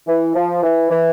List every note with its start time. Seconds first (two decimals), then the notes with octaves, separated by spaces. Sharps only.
0.07 E3
0.36 F3
0.63 E3
0.91 E3